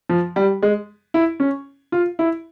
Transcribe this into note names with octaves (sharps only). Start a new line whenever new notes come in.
F3
G3
G#3
E4
C#4
F4
E4